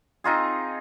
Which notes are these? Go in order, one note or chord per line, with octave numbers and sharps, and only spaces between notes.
C4 D#4 F4 G#4